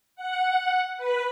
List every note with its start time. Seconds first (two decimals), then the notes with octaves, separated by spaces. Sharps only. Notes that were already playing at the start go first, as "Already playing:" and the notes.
0.16 F#5
0.97 B4